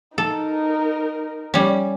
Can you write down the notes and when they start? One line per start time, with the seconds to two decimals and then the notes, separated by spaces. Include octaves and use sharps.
0.18 D#4 A4 A#4
1.54 G3 C#4